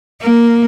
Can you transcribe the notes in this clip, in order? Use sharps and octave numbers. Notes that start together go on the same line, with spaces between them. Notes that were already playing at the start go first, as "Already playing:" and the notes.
A#3